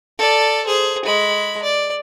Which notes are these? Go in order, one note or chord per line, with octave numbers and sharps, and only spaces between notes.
A4 D5
G#4 C5
G#3 B5
D5